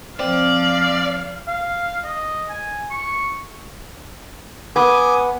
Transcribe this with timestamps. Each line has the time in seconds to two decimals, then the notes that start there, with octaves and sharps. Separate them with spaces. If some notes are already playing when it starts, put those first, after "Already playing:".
0.20 F3 C4 D5 F5
1.48 F5
2.04 D#5
2.49 G#5
2.91 C#6
4.76 B3 G#5 D6 D#6